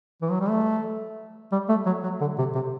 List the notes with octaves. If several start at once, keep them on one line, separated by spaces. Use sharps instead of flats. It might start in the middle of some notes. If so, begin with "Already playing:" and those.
E3
F#3
G3
A3
G3
A3
F#3
F#3
D3
C3
C3